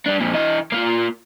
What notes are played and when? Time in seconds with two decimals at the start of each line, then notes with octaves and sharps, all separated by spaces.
0.06 G3 D4
0.20 F2 A#2
0.34 E3 D#5
0.72 A#3 F4